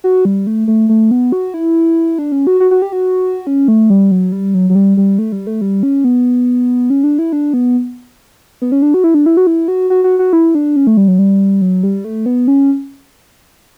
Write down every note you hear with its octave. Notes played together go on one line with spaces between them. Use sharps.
F#4
G3
A3
A3
A3
B3
F#4
E4
D4
C#4
F#4
F#4
F#4
G4
F#4
C#4
A3
G3
F#3
G3
F#3
F#3
G3
G3
A3
G3
A3
G3
C#4
B3
C#4
D4
E4
D4
B3
B3
C#4
D4
F#4
E4
D4
E4
F#4
E4
F#4
F#4
F#4
F#4
E4
D4
C#4
A3
G3
F#3
G3
F#3
G3
A3
B3
C#4